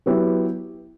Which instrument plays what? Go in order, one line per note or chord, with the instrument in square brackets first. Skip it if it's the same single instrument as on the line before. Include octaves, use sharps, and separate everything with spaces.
[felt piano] F#3 B3 E4 G4